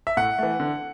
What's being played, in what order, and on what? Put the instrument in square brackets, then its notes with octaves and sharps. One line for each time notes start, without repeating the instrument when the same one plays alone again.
[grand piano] E5
A2 F#5
E3 A3
D3